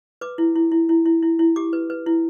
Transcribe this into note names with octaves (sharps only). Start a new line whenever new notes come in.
B4 D6
E4
E4
E4
E4
E4
E4
E4
G4 D6
B4
B4
E4